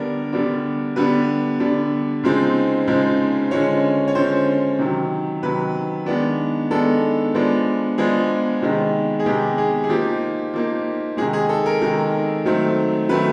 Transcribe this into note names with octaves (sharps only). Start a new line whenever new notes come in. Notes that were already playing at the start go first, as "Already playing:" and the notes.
Already playing: D3 G3 B3 D4 A#4
D3 G3 B3 D4
D3 G3 B3 D4 B4
D3 G3 B3 D4
C#3 F3 G#3 C4 D#4
C#3 F3 G#3 C4 D#4
D3 F3 G#3 C#4 C#5
C#5
D3 F3 G#3 C#4 C5
C3 D#3 F#3
C3 D#3 F#3 B4
D#3 G#3 B3 D4
D#3 G#3 B3 D4 A4
F3 G#3 B3 D4
F3 G#3 B3 D4 G#4
C3 D#3 G#3 B3
G#4
C3 D#3 G#3 B3 G4
G#4
G#4
F3 A#3 D#4 G4
F3 A#3 D#4
C3 D#3 G#3 G#4
G#4
A4
A#4
C3 D#3 G#3 A#4
D#3 F#3 A3 C4
D#3 F#3 A3 C4 B4